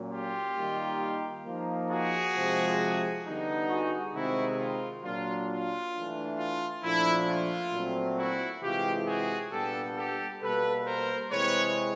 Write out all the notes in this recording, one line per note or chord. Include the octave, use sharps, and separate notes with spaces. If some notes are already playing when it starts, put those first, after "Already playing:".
Already playing: A#2 F#3 A#3 C#4
F4 G4
D#3 G3 A#3 D#4
F3 A#3 D#4
F#4 G#4
C3 F3 G#3
D3 G3 B3 D#4
F#4 G#4
C3 D#3 G#3 C4 D#4 E4 F#4
F4
A#2 F#3 A#3 D4 F4
F4
E3 A3 D4
F4
A#2 F3 A3 D4 E4
F4
A#2 F#3 A3 C4
E4 F#4
C3 E3 G#3 F4 G4
F#4 G#4
A#2 G3 B3 D4 G4 A4
G4 A4
B2 G3 A#3 A4 B4
A#4 C5
C3 E3 G#3 C4 B4 C#5